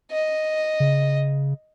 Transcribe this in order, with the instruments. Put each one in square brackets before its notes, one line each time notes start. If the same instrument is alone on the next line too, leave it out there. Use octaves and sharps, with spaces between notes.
[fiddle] D#5
[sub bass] C#3